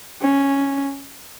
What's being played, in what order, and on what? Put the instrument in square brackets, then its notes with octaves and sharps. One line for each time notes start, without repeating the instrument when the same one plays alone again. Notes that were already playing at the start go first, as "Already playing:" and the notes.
[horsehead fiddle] C#4